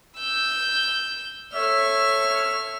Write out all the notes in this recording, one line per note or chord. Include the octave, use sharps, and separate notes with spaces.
E6 G6
A4 C#5 E5 F6